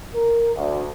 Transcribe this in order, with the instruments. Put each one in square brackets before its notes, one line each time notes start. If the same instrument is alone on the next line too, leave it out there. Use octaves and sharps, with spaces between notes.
[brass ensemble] A#4
D2